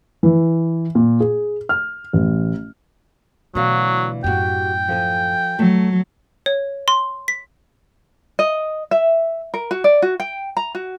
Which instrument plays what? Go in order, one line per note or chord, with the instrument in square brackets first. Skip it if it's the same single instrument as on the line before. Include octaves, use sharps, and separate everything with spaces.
[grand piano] E3
A#2
G#4
F6
A1
[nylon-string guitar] D2 E3 F5 [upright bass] B2 [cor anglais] F#3
[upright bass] F#2 A2 [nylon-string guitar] F#4 G4 [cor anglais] G5
[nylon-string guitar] F3 A4 G#5
[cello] F#3 [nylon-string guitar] A3
[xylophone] C#5
C6
B6
[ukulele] D#5
E5
A#4
F#4
D5
F#4
G5
A#5
F#4